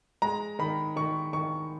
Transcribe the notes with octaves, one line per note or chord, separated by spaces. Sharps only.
G#3 A#5
D#3 B5
D#3 C#6
D#3 C#6